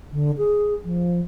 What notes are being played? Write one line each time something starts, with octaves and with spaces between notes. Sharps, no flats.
D3
G#4
F3